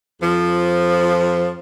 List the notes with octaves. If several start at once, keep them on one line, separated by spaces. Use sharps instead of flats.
F2 F3